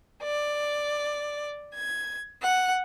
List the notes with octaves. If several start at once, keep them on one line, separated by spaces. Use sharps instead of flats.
D5
G#6
F#5